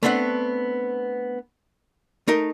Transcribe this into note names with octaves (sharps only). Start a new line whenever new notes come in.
A3 B3 C4 D4 E5 F#5
A3 D#4 A#4